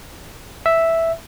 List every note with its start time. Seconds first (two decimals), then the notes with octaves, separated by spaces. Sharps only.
0.66 E5